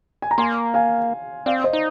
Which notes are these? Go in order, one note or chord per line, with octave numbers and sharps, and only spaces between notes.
G#5
A#5
A#3 G#5 C6
F5 G#5
C4 D5 F5
C5 D#5
D#4